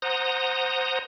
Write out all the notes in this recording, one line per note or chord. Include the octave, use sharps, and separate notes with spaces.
C5 F#5 A#5 D#6